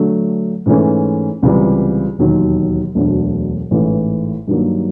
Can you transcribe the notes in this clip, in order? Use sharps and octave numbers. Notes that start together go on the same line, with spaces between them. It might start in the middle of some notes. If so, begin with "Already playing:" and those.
Already playing: D3 F#3 A3
G#2 E3 A3 C#4
C#2 C3 E3 G3
E1 D#2 D#3 F#3
E1 D2 D3 F#3
A1 G#2 E3 A3
G2 D#3 F#3 A#3